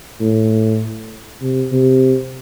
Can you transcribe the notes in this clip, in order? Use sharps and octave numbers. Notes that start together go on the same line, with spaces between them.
A2
C3
C3